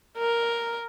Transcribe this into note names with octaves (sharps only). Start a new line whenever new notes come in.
A#4